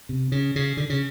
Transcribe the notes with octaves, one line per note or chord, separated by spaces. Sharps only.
C3
C#3
C#3
D3
C#3